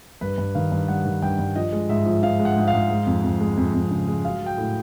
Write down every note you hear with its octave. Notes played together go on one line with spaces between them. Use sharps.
G2 B4
G2
D#3 F5
G2
G3 F#5
D#3
G2 G5
G2
F3 D#5
G#3
G#2 E5
F3
F3 F5
G#3
F#5
G#2
F5
G#2
G#3
F2
F2
G#3
F2
F2
C#3
G#3
F#3 F5
F#3
G5
A2